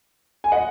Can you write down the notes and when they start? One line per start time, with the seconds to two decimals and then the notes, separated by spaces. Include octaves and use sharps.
0.44 G#5
0.52 D#5 F#5